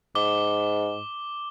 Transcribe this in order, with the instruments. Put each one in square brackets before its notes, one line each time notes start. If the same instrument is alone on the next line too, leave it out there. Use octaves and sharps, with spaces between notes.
[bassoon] G#2 [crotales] D6 G7